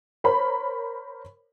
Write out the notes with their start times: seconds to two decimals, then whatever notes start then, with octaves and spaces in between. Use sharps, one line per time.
0.24 A#4 C5 C#5 B5